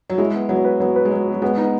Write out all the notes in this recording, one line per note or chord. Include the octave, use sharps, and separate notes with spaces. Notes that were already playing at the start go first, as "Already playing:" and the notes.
F#3
G#3 E4
B3
F#3 B3
B4
F#3 B3
B4
G#3
F#3 B3
B3
F#3
G#3 B3
B3 D#4